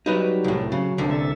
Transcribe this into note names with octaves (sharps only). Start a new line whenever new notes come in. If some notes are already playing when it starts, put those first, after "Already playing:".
F#3 G3 D#4 B4
C2 A2
C#3 F#3
C2 D3
A4 E5